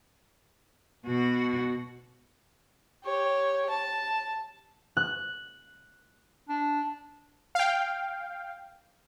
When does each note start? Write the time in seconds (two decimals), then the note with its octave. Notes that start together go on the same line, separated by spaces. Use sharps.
1.06 B2 F#4
3.04 G4 C#5
3.70 A5
4.97 F#6
6.49 D4
7.55 F5 G5